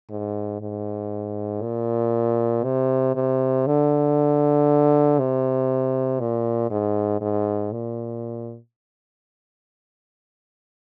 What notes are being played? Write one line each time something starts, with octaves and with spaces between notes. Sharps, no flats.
G#2
G#2
A#2
C3
C3
D3
C3
A#2
G#2
G#2
A#2